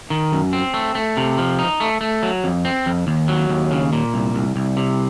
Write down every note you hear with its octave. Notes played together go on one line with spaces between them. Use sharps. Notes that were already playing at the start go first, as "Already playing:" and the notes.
D#3
F#2
C4
A3
A3
C3
F3
D#4
A3
A3
F#3
F2
C4
F2
D#2
F#3
D#2
C#3
A#2
C2
C2
C2
C3